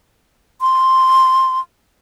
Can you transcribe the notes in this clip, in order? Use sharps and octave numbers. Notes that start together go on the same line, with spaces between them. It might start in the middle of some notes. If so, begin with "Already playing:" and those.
C6